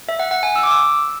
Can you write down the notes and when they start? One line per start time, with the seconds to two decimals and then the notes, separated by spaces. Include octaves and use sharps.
0.09 E5
0.19 F#5
0.31 F#5
0.43 G#5
0.56 E6
0.63 D6
0.71 E6